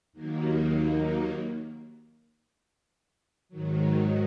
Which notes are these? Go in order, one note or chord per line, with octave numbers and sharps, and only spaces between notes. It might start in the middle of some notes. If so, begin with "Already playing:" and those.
D#2 D#3 F#3 A#3
G#2 D#3 F#3